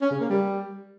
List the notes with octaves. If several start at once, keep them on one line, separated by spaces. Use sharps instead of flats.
C#4
C#3
A#3
G3